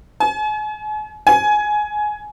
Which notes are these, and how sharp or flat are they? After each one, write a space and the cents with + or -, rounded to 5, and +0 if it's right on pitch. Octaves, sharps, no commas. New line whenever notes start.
G#5 +40
G#5 +15